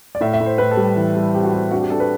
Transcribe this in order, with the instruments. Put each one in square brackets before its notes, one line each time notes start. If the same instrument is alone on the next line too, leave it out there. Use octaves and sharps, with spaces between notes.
[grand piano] D5
A2 E5
E5
A2
C5
A2 B4
A4
G3
E3
G3
C4 G4
F#4
C4 G4
D4 F#4
G4
D4 A4
B4